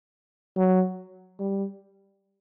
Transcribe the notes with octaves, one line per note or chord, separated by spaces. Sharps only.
F#3
G3